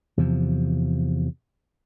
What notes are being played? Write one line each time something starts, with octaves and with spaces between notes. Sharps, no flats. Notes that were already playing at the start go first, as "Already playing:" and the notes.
E2 C3 F3